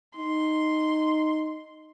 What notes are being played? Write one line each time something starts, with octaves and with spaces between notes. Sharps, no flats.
D#4 C6